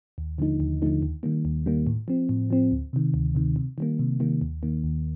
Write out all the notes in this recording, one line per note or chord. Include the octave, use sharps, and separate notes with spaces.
D#2
D3 F3 A3 D#4
D#2
D3 F3 A3 D#4
D#2
D#3 G3 A#3
D#2
D#3 G3 A#3
A2
F3 C4
A2
F3 C4
D2
C3 D#3
D2
C3 D#3
C3
D#3 G3 A#3
C3
D#3 G3 A#3
D#2
D#3 A#3
D#2